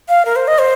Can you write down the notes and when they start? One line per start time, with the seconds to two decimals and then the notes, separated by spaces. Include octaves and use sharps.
0.09 F5
0.25 A#4
0.36 C5
0.48 D#5
0.59 C5